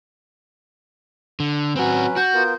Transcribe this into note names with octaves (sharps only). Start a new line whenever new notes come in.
D3
F#3 C4 C#4 F#4 B4
F#4 G6
B3 F4 A#4